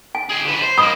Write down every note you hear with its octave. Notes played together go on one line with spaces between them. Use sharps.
G#5
G#4 G5
D3 B4
C5
G#2 A#3 B5 D#6